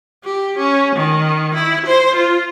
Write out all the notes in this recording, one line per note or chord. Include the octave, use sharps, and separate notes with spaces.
G4
C#4
D#3
E4
C5
F4